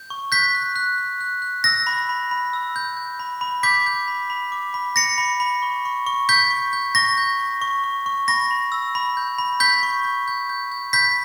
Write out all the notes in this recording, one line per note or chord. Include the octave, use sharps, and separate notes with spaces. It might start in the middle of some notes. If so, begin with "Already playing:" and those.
Already playing: G6
C#6
F#6 G6 B6
F#6
F#6
F#6
F#6
F#6
E6 A#6
B5
B5
B5
E6
G6
G6
B5
B5
D6 G6 B6
G6
B5
B5
D6
B5
B5 A#6 C#7
B5
B5
C#6
C#6
C#6
C#6 G6 B6
C#6
G6
C#6 A#6
G6
C#6
C#6
C#6
C#6
B5 A#6
B5
E6
B5
G6
B5
C#6 G6 B6
C#6
G6
G6
G6
G6
B5 G6 B6